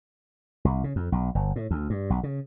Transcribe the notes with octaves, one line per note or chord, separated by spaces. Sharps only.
C2
C#3
F2
B1
G1
A2
D2
G2
B1
C#3